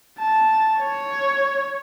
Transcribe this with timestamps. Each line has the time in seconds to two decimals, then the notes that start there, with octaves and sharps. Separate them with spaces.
0.19 A5
0.80 C#5